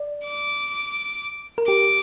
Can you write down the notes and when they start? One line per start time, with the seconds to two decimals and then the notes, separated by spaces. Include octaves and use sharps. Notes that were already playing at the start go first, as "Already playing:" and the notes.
Already playing: D5
0.25 D6
1.58 A#4
1.67 G4 D6